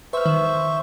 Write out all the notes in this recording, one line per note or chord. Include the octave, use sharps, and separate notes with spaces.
B4 C5 E5 C#6 F6
D#3